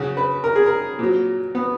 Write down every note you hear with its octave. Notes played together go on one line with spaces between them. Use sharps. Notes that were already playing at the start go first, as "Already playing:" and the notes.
Already playing: C#3 F#3 F#4
B4
A#4
G#4
A#4
A#2 F#3
B3